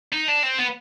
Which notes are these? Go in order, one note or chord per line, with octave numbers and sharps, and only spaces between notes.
D#4
D4
C4
B3